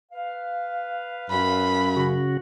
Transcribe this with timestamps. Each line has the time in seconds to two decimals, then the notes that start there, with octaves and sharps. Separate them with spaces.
0.12 B4 F5
1.31 F#2 B5
1.96 C#3 F#4